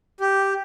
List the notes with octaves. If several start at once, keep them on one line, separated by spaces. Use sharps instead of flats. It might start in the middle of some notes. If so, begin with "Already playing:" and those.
G4